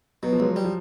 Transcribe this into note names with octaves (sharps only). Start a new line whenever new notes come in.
B2 F#3
F3
C#2 F#3
G3
F3